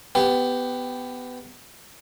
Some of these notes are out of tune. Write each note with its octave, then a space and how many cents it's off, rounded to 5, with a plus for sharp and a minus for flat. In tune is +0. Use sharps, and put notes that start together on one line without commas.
B3 +15 G4 +0